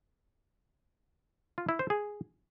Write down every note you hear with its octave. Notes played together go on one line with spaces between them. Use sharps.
F4
E4
C5
G#4